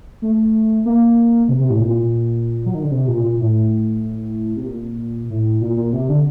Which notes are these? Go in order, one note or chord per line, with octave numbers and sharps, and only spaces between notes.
A3
A#3
C3
C3
A2
A#2
F#3
D#3
D3
C3
A#2
A#2
A2
C3
A#2
A2
A#2
A#2
C3
D3